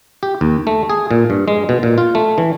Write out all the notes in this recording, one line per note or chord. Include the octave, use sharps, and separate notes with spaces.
G4
D#2
A3
G#4
A#2
G2
G#3
B2
A#2
F4
A3
E3